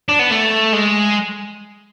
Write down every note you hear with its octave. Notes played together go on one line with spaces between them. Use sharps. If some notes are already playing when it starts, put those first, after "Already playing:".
D4
B3
A3
G#3